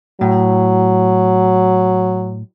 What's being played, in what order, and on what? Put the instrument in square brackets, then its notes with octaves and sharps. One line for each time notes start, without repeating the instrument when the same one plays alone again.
[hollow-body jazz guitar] A2 [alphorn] F#3